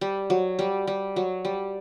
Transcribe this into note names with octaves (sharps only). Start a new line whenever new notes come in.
G3
F#3
G3
G3
F#3
G3